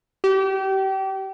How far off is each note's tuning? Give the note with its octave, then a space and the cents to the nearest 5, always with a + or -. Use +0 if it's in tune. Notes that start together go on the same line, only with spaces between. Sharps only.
G4 -30